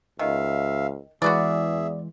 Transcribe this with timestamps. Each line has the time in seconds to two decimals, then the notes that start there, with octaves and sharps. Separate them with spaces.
0.19 C#2 D#3 E5 F5
1.22 E2 E3 G#3 F#4 G#4 B4 D5 E5